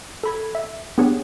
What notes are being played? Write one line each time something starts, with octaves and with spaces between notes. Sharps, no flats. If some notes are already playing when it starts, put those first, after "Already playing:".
A4 B5 G#6
E5
B3 D4 G4 G#4 C#5 F#5